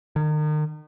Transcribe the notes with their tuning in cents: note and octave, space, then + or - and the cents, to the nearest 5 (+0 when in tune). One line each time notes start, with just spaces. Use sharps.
D#3 -35